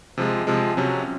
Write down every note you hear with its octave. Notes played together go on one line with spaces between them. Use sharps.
C3 F3 G#3
C3 F3 G#3
C3 F#3 C#4